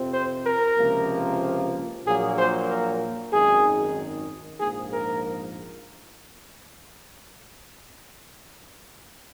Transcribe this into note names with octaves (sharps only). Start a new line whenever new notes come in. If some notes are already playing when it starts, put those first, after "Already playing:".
Already playing: F2 C3 F3 C4
C5
A#4
C#2 C3 F3 A#3
A#1 A#2 F#3 A#3 G#4
C5
A#4
G#1 F#2 D#3 G#4
A#1 G#2 F3 A#3 G#4
A#4